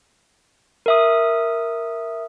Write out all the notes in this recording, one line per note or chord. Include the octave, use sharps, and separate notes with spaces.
A#4 E5 D#6